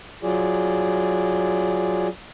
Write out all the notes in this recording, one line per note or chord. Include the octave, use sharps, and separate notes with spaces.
F#3 F4 G#4 D5